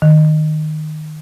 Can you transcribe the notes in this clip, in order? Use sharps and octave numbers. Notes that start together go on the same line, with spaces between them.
D#3